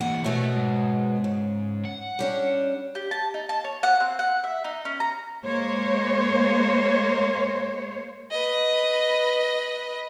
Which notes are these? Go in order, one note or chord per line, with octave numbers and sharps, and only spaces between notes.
E3 A#3 F#5
F#2 B2 A3 B3 E5
G#2
C#3
F#5
G3 C#4 D4
G4
A5
D#4
A5
C#5
F#5
C4
F#5
E5
D#4
C#4
A#5
G#3 A#3 C5 C#5
B4 D#5